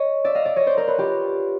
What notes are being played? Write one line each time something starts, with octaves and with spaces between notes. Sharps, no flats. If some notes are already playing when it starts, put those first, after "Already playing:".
Already playing: C#5 D#5
D5 E5
D#5 F5
D5 E5
C#5 D#5
C5 D5
A#4 C5
B4 C#5
F4 G4